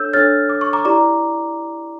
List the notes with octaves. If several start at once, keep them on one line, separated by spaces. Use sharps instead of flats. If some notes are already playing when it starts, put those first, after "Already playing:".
Already playing: D4 A4 C#5 E6 G6
D4 A4 C#5 F6 A6
D6
C#6
A#5 D6
E4 G4 D5 A#5 D6